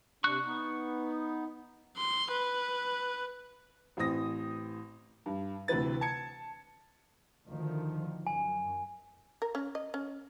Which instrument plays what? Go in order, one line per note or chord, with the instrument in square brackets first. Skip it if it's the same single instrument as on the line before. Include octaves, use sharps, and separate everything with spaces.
[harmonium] C3 D4 [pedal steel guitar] C#6 F#6
[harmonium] B3 D#4
[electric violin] C6
B4
[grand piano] A1 E3 C4 D#6 A#6
G2
D2 C3 E3 B4 A6
A5 G#6 C#7
[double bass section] D2 D#3 F3
[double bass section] F#2 [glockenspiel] G#5
[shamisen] A#4
C#4
D#5
C#4